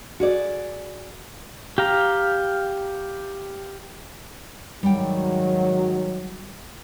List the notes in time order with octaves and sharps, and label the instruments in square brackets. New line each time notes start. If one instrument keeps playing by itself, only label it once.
[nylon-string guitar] F#4 G#4 D5
[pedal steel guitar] G4 F5 A#5
[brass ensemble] G#2 D#3 F#3 [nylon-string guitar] G3 G5